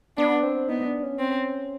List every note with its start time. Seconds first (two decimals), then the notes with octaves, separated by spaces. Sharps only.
0.18 B3 D4
0.43 C4
0.69 B3 D#4
0.85 D4
1.03 C#4
1.19 C4